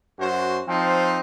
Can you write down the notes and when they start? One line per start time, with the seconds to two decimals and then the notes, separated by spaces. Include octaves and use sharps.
0.18 F#2 F#4 C5
0.67 F3 C4 D#4